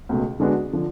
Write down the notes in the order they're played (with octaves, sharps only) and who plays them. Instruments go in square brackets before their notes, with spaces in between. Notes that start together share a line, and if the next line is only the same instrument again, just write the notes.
[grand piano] C#2 B2 A3
D3 G#3 B3 D4 F#4
D3 F3